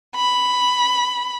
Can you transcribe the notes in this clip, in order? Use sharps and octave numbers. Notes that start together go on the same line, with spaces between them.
B5